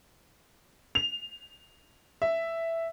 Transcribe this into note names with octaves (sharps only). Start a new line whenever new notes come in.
F7
E5